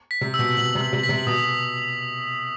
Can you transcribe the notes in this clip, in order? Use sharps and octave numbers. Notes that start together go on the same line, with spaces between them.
B6
C3
B2 E6
B2 F#7
C3
E6
C3
B6
C3
B2 D#6